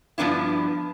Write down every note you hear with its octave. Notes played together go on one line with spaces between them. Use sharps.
G2 F3 B3 D4 E4